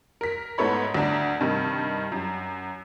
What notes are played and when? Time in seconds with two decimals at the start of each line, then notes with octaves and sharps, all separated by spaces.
0.21 A#4 B6
0.58 G#2 A3 B3 A4 C#5 B5
0.94 D2 D4 A#5
1.40 G2 C3 D#3
2.12 F#2